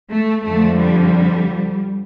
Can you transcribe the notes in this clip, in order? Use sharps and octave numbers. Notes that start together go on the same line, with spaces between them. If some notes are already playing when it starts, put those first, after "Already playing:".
A3
F2 D3 F3 A3
G3